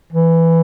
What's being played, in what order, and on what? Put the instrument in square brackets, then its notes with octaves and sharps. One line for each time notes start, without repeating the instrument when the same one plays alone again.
[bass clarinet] E3